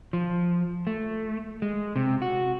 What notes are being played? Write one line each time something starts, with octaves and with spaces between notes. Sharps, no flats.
F3
A3
G#3
C3
F#4